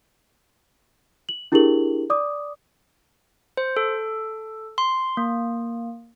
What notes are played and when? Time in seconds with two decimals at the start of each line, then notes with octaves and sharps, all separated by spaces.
1.29 F#7
1.52 D4 E4 G4 G#4 A#4 F#7
2.10 D5 D6 D#6
3.57 C5
3.77 A4
4.78 C6
5.17 A#3